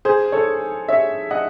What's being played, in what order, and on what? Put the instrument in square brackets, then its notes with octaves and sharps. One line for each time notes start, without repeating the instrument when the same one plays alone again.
[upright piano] G#4 C5
A4 C#5
C#5 E5
D#5 F#5